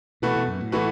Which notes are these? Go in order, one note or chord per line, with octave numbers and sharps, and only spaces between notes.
B2 E3 A3 F#4 B4
B2
F#2
A2
E3 A3 F#4 B4